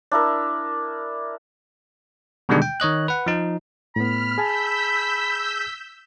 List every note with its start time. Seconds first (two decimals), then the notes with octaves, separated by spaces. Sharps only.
0.11 D4 E4 A#4
2.49 B2 D3 D#3 G3 G#3 D4
2.62 G5
2.80 D#3 C#5 D#5 F#6
3.08 B4 F#5
3.26 F3 D#4
3.96 A2 B3 B5 F6
4.38 G#4 G#5 A5 E6 G6 B6